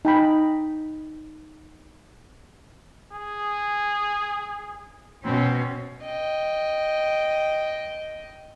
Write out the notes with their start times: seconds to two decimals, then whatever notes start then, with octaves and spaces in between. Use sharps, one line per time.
0.05 D#4 G5 B5
3.13 G#4
5.25 B2 C4 C#4
6.03 D#5 G5